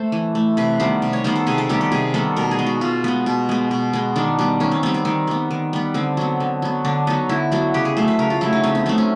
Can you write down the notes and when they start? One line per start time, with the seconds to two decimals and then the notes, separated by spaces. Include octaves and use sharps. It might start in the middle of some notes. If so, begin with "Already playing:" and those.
Already playing: A3 C5
0.12 E3
0.35 A3
0.57 C3 B4
0.80 D#3 G3 B3 C5
1.02 C3
1.13 C#5
1.24 D#3 G3 B3 C5
1.36 A4
1.47 C3 G#4
1.58 A4
1.69 D#3 G3 B3 G4
1.81 G4
1.92 C3 G#4
2.14 D#3 G3 B3 A4
2.37 B2 A#4
2.51 G#4
2.59 G#3 B3
2.66 F#4
2.81 B2 F4
3.04 G#3 B3
3.26 B2
3.49 G#3 B3
3.71 B2
3.93 G#3 B3
4.16 D#3 D4
4.39 G3 B3
4.60 D#3 C#4
4.72 C4
4.83 G3 B3 C4
4.94 C4
5.05 D#3 C4
5.27 G3 B3
5.51 D#3
5.73 G3 B3
5.94 D3 C4
6.17 F#3 B3
6.40 D3
6.62 F#3 B3
6.85 D3 D4
7.07 F#3 B3 D#4
7.29 D3 E4
7.52 F#3 B3 F#4
7.74 C#3 G4
7.85 G#4
7.97 F#3 A3 C5
8.08 B4
8.19 C#3 A#4
8.30 F4
8.41 F#3 A3 E4
8.53 D#4
8.64 C#3 C4
8.75 B3
8.86 F#3 A3 C4
8.98 C#4